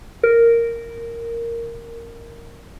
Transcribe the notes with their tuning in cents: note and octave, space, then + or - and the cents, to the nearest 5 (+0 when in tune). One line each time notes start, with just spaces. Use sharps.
A#4 -5